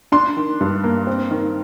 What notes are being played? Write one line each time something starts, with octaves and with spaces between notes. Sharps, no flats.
D4 C6
D#3
G2
A#3
C4
D#3